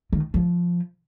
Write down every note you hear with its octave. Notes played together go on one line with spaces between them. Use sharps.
D#3
F3